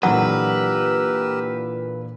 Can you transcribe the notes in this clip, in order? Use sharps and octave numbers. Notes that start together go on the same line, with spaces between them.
A#2 D3 E3 F#3 G4 A#4 B4 E6